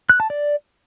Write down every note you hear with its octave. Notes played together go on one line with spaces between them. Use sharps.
F#6
A5
D5